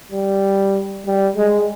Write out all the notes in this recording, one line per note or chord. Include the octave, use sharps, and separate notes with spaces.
G3
G3
G#3